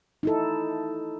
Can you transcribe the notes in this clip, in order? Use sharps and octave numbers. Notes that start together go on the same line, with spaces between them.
D#4 E4 A4